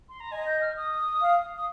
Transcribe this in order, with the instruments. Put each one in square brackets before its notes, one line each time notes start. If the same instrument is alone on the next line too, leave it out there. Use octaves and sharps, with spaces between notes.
[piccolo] C6
A#5
[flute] D#5 [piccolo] G#5
[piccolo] G6
F6
D#6
[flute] F5
[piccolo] D#6